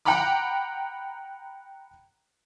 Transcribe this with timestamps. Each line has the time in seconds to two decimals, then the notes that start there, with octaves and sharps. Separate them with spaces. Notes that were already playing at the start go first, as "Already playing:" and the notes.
0.05 F#5 G5 A#5 B5 D6